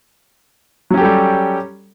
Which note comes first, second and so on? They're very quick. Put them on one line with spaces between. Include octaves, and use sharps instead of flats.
F#3 C#4 G4 A4 G3